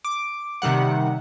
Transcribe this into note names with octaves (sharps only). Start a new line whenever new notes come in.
D6
C3 D#3 G3 F#5